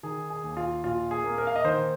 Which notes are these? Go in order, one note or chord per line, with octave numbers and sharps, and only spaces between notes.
D#3 G#4
G#4
D#2
F4
A#1 F4
G#4
A#3
A#4
F5
D#5
D#3 C5